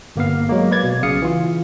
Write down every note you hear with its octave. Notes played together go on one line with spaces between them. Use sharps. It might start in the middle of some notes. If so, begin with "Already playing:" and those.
G1 A#3 B3 F5
F#3 G#3 A#3
B4 D5 G#6 A6
B2
B1 C#3 F5 D#6 C#7
E3 F4